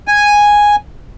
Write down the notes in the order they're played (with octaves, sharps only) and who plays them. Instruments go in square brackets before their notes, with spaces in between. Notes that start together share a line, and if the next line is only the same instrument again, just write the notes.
[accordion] G#5